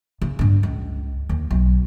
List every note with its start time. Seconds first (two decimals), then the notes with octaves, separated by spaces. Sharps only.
0.22 C#3
0.39 G2 D4
0.63 C#2
1.29 D#2
1.51 B1